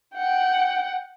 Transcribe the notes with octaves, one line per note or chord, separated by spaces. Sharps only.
F#5 G5